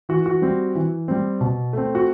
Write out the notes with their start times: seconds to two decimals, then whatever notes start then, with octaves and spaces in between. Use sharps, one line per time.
0.09 E3 F#4
0.26 F#4
0.42 G3 C4
0.75 E3
1.08 G3 C4
1.41 B2
1.73 A3 C4
1.95 F#4